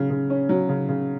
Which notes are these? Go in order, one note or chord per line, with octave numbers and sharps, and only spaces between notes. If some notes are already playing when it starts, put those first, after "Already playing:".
Already playing: C#3 F#3
C#3
C#4
F#3
C#3
C#3